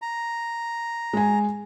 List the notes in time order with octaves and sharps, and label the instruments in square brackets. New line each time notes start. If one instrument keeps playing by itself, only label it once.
[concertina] A#5
[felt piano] G#3 G#5